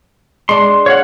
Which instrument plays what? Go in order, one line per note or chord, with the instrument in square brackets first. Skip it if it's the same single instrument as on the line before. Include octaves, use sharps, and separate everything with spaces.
[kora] G#3 D4 [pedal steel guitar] C6
[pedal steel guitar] C#5 F5 F#5